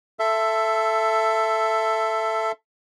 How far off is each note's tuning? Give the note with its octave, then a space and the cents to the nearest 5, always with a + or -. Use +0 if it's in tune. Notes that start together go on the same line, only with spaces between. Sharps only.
A4 +0 E5 +15 C6 +0